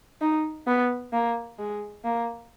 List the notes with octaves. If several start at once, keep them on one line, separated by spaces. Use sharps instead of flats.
D#4
B3
A#3
G#3
A#3